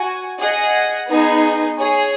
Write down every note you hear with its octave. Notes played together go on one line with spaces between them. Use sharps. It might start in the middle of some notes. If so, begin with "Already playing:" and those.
Already playing: F#4 G#5
G#4 D#5 F#5
B3 D#4 G#4
G#4 C#5 G#5